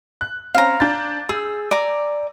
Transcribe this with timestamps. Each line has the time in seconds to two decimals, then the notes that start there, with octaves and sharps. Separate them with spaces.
0.21 F#6
0.54 C4 C#4 F5 A#5
0.80 D4 G6 A6
1.29 G#4 E6
1.71 D5 G#5 A#5